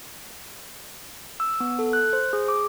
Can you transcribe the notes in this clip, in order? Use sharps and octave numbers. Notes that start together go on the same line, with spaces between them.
E6
B3
A4
F#6
C5
G#4
D6